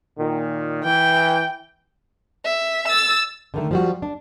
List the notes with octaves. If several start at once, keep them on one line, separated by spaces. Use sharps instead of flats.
A#2 D#3
E3 G5
E5
E6 A6
D3 D#3 A3
F3 G3 F#4
D4